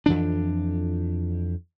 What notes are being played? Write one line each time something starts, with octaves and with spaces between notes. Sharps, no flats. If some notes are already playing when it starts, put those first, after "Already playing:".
F2 E3 D4